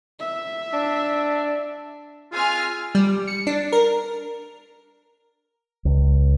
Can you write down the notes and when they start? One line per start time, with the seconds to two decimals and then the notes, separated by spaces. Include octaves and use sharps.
0.19 E5
0.74 D4
2.32 G#3 C4 F4 G#5 F6
2.95 G3
3.28 C#7
3.47 D4
3.72 A#4
5.85 C#2